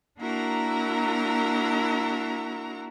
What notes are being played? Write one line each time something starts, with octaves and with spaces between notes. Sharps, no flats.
A#3 D4 E4 F#4 A#4 A#5